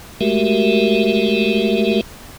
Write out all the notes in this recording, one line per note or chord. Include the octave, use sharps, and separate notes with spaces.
G#3 A3 F#4 G4 A#4 E5